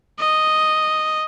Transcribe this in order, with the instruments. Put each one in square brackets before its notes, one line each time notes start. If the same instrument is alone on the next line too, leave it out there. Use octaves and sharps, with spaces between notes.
[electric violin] D#5